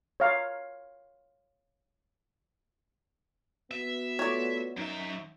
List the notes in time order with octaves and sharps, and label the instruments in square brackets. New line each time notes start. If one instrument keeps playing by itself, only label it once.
[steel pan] C#5 F5
[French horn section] B3 F#4 [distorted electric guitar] E5
[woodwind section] A3 F4 A4 [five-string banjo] C#5 D5
[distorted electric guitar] F#2 E5 [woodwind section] D#4